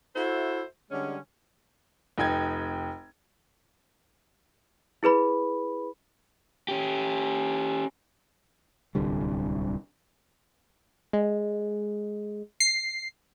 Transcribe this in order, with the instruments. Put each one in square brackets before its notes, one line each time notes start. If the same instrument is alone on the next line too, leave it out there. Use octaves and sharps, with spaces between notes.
[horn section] E4 F#4 A4 C5 E5
D3 G3 G#3 C#4
[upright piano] F1 D#4 G5 G#6
[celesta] E4 G#4 B4 B5
[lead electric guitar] C#4 G4
[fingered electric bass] D1 C2 D3 G3
[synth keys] G#3
C7